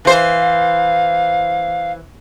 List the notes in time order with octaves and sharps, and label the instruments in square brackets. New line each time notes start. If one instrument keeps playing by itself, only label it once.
[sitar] E3 C5 [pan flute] F5